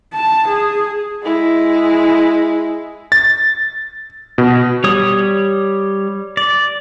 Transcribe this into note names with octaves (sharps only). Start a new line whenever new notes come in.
A5
G#4
G#3 E4
A6
B2
G3 C#5 D#6
D5